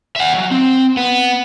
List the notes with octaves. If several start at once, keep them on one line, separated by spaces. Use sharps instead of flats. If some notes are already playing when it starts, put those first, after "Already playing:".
E5 F#5
F#3
C4
B3